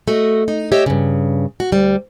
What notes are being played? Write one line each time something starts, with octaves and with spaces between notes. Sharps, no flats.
A3 F#4 D#5
D#4
G4 C#5 D#5 E5
G2 C#3
F#4
D2 G3